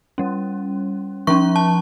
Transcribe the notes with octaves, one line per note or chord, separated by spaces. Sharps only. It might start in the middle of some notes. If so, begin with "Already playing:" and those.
G3 C#4
F3 C#4 C#6
A5